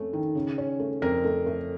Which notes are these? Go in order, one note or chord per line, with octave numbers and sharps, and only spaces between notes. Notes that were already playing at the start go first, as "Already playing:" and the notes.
Already playing: F2 A3 C#4
D#3
C#3
C#4
A3
F2 A#4
A3
A3